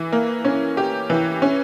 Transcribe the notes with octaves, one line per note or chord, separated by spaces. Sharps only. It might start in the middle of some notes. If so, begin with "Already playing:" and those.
Already playing: E3
A#3
C#4
G4
E3
C#4